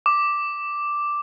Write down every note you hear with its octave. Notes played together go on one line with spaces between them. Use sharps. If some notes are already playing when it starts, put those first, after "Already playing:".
D6